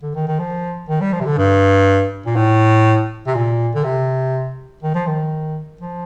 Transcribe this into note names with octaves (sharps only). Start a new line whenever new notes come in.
D3
D#3
D#3
F3
D#3
G3
F3
C3
D3
G2
A#2
A2
C3
A#2
D3
C3
D#3
F3
D#3
F3